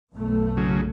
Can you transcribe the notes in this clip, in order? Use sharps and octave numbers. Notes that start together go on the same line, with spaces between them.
B1 F#2 A3
C#3 F#3